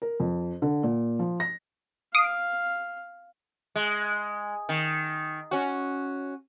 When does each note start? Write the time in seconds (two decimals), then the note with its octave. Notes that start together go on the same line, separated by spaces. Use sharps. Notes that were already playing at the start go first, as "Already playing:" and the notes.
0.02 A#4
0.20 F2
0.62 D3
0.83 A#2
1.19 F3
1.40 A#6
2.15 F5 D#6 C7 D7
3.76 G#3
4.69 D#3
5.51 C#4 F#4